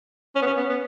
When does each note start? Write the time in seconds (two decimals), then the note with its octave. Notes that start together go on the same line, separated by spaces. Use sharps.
0.36 C#4
0.42 B3
0.46 C#4
0.57 B3
0.70 B3